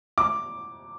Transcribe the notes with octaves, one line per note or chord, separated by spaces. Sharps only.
D6